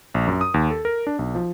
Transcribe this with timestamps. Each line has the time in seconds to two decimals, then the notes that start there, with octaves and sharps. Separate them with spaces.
0.14 A#1
0.27 F#2
0.41 D#6
0.54 D#2
0.70 A4
0.85 A#4
1.07 D4
1.19 B1
1.35 F3